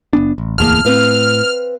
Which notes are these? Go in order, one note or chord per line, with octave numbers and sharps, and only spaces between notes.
F#1 B3 D4
A1
D1 E2 A2 A#3 G#4 A5 F6
A2 C4 B4 F5